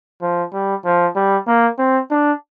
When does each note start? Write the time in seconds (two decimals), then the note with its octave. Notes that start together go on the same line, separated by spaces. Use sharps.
0.22 F3
0.53 G3
0.85 F3
1.16 G3
1.47 A#3
1.78 C4
2.11 D4